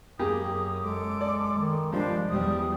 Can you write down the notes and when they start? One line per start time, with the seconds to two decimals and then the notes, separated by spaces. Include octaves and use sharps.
0.19 F#2 A#3 G4 G#4 D#6
0.83 G#3 A4 D6
1.21 D5
1.58 D#3
1.92 G2 F3 G#3 D4 C5 F5
2.29 E2 G3 D#6